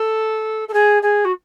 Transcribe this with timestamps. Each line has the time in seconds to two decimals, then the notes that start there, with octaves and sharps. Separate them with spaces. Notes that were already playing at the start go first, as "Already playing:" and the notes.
Already playing: A4
0.68 A4
0.73 G#4
1.02 G#4
1.25 F#4